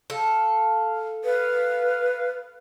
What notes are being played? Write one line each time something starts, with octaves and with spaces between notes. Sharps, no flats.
A4 F5
B4 F5